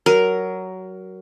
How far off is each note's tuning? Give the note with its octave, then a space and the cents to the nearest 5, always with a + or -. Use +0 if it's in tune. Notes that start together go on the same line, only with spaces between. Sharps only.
F#3 +15 A#4 +0